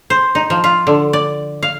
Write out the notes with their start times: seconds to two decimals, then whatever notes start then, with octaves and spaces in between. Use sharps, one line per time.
0.10 C5
0.35 D#4
0.50 F3
0.64 F4
0.87 D3
1.13 D5
1.63 F5